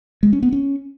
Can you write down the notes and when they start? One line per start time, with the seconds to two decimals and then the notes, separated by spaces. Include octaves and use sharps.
0.23 G#3
0.33 C#4
0.43 B3
0.52 C#4